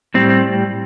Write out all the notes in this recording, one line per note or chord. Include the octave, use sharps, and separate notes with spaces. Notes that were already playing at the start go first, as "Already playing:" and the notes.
A2 G3 C4